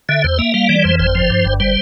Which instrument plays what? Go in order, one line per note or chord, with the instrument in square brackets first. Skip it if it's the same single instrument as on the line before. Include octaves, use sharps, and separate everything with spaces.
[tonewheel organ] D3 E5
E2 C5
A#3 E5
G3 F5
E3 D5
F2 C5
G1 C5
F3
G2
G1
G3 C5